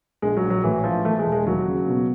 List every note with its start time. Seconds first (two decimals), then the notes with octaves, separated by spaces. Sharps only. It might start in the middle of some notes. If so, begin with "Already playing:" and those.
0.22 A#1 G#3
0.37 F#3
0.44 A#1
0.50 F#3
0.64 A2 E3
0.84 E3 F3
1.05 E3 A3
1.19 G#3
1.26 E1
1.32 G#3
1.46 D#2 F#3
1.67 C#3
1.88 B2